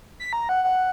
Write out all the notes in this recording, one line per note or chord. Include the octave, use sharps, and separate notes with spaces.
B6
A#5
F#5
F#5